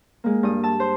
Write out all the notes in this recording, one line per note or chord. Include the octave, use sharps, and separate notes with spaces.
G#3 A#3
G2 D#6
A5 E6
C5